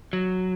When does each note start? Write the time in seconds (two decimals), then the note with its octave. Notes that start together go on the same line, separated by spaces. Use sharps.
0.13 F#3